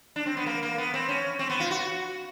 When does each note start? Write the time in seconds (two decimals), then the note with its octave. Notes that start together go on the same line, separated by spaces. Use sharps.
0.16 D4
0.26 C4
0.37 B3
0.46 A#3
0.63 A#3
0.78 B3
0.94 C4
1.09 C#4
1.39 C4
1.50 B3
1.60 F4
1.71 F#4